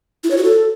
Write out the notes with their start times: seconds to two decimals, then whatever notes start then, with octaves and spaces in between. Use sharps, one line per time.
0.24 E4
0.31 C#5
0.37 F#4
0.44 A4